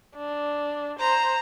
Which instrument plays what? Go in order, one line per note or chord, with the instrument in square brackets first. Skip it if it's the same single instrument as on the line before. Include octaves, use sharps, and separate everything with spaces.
[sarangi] D4
[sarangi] C5 [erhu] A#5